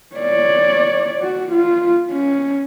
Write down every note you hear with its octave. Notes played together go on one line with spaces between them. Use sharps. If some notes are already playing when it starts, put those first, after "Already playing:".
C#5 D5
F#4
F4
C#4